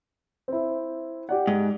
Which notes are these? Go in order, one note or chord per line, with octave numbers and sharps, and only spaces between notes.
C4 E4
G4 D5 F#5
G#2